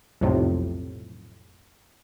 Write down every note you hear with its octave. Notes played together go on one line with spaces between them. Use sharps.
B1 F2 A2 C3